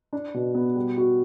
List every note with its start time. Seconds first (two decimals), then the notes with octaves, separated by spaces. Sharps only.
0.13 D4
0.34 B2
0.55 B3
0.76 G3
0.97 F#4